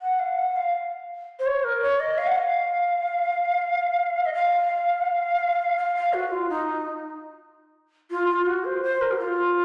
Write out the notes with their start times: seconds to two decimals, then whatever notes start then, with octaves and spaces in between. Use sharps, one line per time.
0.01 F#5
0.19 F5
0.37 F#5
0.55 F5
1.39 C5
1.46 C#5
1.63 A#4
1.81 C#5
1.99 D#5
2.17 F5
2.26 F#5
2.35 F5
4.25 D#5
4.33 F5
5.00 F#5
5.05 F5
5.77 F5
5.95 F5
6.13 F#4
6.31 F4
6.48 D#4
8.10 F4
8.29 F4
8.46 F#4
8.64 C5
8.82 C5
9.01 A#4
9.11 F#4
9.18 F4